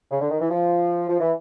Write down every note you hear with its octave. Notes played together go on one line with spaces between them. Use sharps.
C#3
D3
D#3
E3
F3
F3
E3